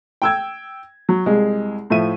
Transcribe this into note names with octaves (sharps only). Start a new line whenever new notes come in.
G5 E6 G#6
F#3
C2 G#3 G#4
A2 F3 E5 D#7